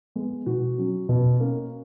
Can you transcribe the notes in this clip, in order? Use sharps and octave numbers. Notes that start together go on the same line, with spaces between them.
G#3 B3
B2 F#4
F#3 C#4
B2
A#3 C#4